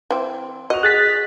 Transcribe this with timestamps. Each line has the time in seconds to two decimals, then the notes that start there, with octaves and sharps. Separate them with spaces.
0.10 E3 C4
0.70 F#4 D#5 F7
0.83 G#4 F#6 A6 B6